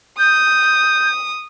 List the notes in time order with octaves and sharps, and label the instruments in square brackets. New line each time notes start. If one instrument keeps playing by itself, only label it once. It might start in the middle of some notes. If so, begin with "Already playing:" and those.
[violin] D#6 [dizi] G6